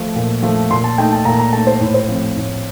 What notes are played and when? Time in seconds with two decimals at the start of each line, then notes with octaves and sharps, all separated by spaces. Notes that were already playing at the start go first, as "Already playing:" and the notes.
Already playing: F3 A3
0.16 A#2
0.43 F3 A3
0.70 A#2 C6
0.84 A5
0.98 A3 D#4 G5
1.12 A5
1.25 A#2 A#5
1.39 A#5
1.53 A3 D#4 A5
1.67 C5
1.81 A2
1.94 C5
2.08 F3 A3 C4
2.36 A2